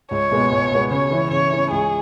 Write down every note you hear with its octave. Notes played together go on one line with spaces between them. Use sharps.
C#2 C#5
B2 G#3 B3
C#2
B2 G#3 B3
C#3 C#5
E3 C#4 E4
C#3 C#5
E3 C#4 E4
C#2 G#4